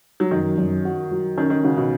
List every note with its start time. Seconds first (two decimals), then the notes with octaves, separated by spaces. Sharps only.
0.20 F#3
0.31 F#2 D#3
0.58 F#2
0.85 F#4
1.11 F#3
1.38 D#3 C#4
1.50 D#3
1.64 C#3 F#4
1.77 B2